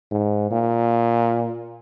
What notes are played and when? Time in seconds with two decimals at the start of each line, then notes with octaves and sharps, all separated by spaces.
0.11 G#2
0.51 A#2